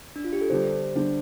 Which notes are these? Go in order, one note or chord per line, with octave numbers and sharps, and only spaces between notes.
D4
F4
G4
A4
D3 G3 D4 G4 C5
D3 G3 D4 G4